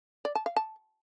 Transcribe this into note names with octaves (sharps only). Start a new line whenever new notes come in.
D5
A5
F5
A5